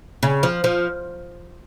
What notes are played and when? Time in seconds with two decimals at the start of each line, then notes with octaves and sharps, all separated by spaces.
0.23 C#3
0.43 F3
0.64 F3